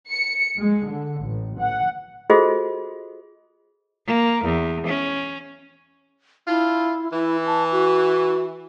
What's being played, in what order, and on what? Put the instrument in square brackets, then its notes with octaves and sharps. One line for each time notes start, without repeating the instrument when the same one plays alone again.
[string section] C#7
G#3
D3
A1
F#5
[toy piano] F4 F#4 G#4 A4 C5 D#5
[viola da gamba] A#3
E2
C#4
[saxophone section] D4 F4 [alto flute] E4
[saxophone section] E3 [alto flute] E4
[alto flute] A5
F#4